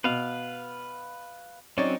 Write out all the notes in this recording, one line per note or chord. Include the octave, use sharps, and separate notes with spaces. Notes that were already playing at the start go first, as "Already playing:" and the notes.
B2 B4 F5
F#3 C4 C#4 D#4 C#5 D5